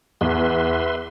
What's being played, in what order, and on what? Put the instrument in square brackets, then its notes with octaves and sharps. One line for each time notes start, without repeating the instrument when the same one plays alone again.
[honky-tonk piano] E2 [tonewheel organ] B4 E5 C6